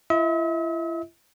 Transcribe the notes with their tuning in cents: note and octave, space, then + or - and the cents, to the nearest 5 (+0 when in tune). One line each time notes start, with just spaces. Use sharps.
E4 +40 E5 -45